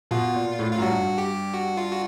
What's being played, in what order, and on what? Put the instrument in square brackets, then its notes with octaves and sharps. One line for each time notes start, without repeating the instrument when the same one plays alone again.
[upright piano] B2 [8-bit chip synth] F4
[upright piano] A#2
A2
[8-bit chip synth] F4
[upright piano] F#2
[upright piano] G2 [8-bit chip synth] F#4
[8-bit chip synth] G4
F#4
F4
F#4